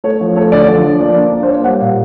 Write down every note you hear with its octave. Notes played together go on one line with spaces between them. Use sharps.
A3 C#5
F3
A3 C#5
D3 D5
F3 D5
F3
A#3 D5
D4
A#3
C5
A#3 C#5
G3 F#5
A#2 F5